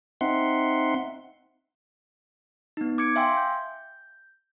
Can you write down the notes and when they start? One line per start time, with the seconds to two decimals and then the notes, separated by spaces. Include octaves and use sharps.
0.21 C4 D#4 E5 F#5 C6
2.77 B3 D#4
2.98 D6 G#6 C#7 D7
3.16 E5 F5 G5 G#5 C6 E6
3.37 G6